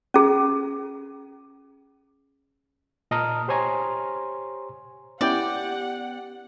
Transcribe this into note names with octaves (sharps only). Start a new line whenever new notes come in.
C#4 G#4
A#2 D#5 A5 A#5 D#6 F6
G4 C5 C#5 G#5 A#5 C6
B3 C#4 E4 G4 D5 F#5 G5